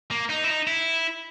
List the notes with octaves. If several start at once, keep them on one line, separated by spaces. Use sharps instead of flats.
A#3
D#4
E4
D#4
E4